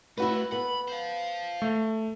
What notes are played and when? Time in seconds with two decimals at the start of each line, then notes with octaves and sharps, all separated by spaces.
0.18 A3 E4 F#4 B4
0.52 B3 B5
0.88 C5 F5
1.62 A3